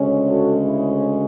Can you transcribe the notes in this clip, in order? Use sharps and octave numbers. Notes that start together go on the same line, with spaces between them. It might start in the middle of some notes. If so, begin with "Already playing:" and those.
Already playing: D2 C#3 G#3 C#4
F#4 A4
E4 G#4